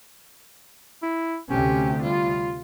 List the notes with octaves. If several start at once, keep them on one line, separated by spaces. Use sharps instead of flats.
E4
D2 C3 C#4 G4
G3 F4